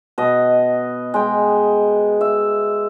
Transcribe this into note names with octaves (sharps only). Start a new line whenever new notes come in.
B2 D#5
G#3 G5
E5